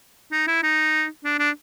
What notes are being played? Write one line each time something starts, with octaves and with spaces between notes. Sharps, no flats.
D#4
E4
D#4
D4
D4